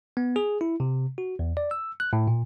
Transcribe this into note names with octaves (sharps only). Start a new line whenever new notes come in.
B3
G#4
E4
C3
F#4
E2
D5
E6
F#6
A2
A#2